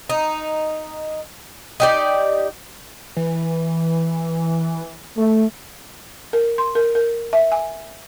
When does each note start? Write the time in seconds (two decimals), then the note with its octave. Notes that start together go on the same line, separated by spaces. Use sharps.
0.10 D#4
1.80 D#4 G4 D5
3.17 E3
5.17 A3
6.33 A#4
6.58 C6
6.75 A#4
6.95 A#4
7.33 E5
7.52 G#5